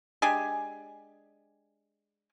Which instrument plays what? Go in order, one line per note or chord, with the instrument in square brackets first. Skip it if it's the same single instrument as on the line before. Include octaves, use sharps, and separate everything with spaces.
[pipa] G#3 D4 G4 G#5